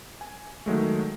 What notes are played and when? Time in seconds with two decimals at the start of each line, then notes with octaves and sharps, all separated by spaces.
0.21 G#5
0.66 D#3 F#3 G#3 A3